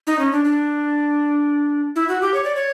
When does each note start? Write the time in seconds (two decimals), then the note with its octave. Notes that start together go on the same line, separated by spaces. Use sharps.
0.07 D#4
0.19 C#4
0.32 D4
0.45 D4
1.96 E4
2.09 F#4
2.21 G4
2.34 C#5
2.44 D5
2.56 C#5